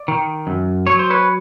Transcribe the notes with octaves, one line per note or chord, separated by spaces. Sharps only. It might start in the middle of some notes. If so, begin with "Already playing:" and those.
Already playing: D5
D#3
F#2
F#3 C#5
C5
B4 C#5